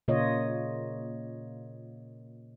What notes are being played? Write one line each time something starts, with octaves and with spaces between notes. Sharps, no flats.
A#2 C#3 A#3 F4 C#5 D#5